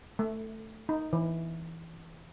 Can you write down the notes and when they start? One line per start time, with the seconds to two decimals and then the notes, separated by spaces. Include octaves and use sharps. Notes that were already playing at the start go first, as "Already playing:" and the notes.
0.19 A3
0.89 D#4
1.13 E3